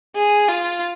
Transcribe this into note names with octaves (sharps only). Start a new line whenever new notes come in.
G#4
F4